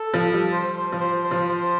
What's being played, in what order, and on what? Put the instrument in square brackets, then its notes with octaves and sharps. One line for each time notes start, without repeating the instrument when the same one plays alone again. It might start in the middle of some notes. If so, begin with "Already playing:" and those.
Already playing: [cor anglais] A4
[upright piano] F3
G3
[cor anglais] C5
C5
[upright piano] F3
[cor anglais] C5
C5
[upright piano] F3
[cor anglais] C5